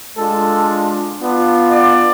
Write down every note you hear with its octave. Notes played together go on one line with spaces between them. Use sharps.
G#3 D4 F4 A4
B3 D4 F4
D5